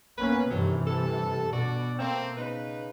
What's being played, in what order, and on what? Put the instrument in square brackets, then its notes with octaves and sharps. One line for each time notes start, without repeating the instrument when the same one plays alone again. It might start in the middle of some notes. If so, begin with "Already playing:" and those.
[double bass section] A#3 B3 C#4 [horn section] B4
[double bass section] G2 C3 E3 [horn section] D#3 F#3 A3
[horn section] A4
[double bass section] B2 [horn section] D4 F#4 D5
[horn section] A3 A#3 C4
C#3 D#4 B4